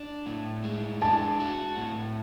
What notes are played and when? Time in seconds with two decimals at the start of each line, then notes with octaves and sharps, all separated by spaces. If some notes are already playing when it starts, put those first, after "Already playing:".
Already playing: D4
0.26 A2
0.64 G#3
1.01 D4 A5
1.40 F#4
1.77 A2